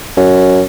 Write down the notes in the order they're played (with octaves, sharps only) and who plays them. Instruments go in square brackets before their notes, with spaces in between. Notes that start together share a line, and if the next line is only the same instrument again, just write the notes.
[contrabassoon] F#2